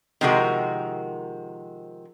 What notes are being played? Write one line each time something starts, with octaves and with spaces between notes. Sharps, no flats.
C3 D#3 F3 G#3 F#4 A#4